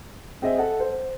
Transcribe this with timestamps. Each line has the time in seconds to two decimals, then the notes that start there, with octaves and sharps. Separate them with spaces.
0.42 C4 G#4 D#5 E5
0.58 A4 F#5
0.80 C5